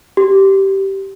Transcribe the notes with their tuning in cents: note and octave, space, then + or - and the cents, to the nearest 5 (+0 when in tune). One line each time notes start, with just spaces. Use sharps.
G4 -15